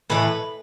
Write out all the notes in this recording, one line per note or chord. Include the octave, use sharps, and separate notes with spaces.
A2 E3 A3 B4